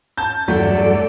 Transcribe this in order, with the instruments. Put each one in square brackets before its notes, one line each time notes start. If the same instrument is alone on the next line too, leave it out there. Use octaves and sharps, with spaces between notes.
[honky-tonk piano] A5 G6
[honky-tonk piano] E2 A3 [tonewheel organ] G2 F#3 [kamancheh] A4 D5